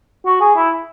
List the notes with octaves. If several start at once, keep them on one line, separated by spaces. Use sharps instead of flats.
F#4
G#4
E4